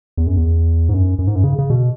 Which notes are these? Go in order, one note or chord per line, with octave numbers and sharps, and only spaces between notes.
E2
F#2
E2
G#2
F#2
F#2
G#2
F#2
C#3
C#3
B2